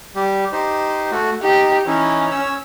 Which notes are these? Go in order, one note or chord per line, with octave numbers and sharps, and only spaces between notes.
G3 G4
D#4 G4 C5
A3 F#4
D#4 G4
E3 C#4 D#4 E4
C#5 E6